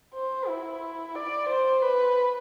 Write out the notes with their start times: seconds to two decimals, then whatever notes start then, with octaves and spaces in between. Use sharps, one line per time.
0.14 C5
0.48 E4
1.15 D5
1.49 C5
1.82 B4